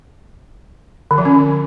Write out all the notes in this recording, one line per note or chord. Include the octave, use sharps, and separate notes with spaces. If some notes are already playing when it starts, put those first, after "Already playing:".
D3
F3
C#4